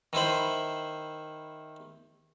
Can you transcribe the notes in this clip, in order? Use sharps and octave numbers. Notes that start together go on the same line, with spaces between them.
D#3 E4 C5 B5